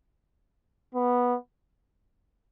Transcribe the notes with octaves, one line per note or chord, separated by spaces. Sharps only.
B3